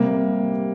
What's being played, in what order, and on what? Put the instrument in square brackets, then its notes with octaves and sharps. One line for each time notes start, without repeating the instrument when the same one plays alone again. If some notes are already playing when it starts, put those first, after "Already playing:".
Already playing: [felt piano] C3 G3 A#3